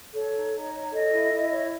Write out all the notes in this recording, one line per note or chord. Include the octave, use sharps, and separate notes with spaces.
A4 C#5
D#4
D#4
C#5
A4 D#5
E4
E4
C#5